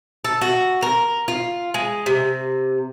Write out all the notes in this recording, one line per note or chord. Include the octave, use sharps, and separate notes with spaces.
A4
F#4
A#4
F4
G#3
C3